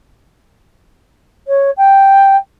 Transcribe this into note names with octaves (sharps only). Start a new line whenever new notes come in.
C#5
G5